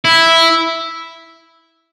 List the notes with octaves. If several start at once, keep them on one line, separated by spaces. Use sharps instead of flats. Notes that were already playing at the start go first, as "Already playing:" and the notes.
E4